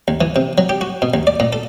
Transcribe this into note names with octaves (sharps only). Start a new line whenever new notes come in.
D#2
E3
C3
F#3
G4
F#4
B2
D#2
D5
A#2
A4